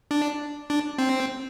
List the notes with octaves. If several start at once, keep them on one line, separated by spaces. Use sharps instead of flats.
D4
D4
C4